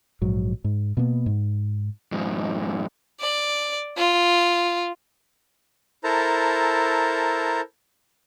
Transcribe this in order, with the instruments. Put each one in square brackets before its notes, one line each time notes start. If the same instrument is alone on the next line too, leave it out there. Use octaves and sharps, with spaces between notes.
[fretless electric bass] A#1 G#2 F#3
G#2
B2 A#3 B3
G#2
[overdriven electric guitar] F2 G#2
[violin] D5
F4
[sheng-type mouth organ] E4 A4 A#4 C5 A5 A#5